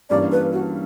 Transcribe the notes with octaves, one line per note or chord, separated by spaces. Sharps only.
G2 E3 G3 A#3 C#4 D5
B4
F#4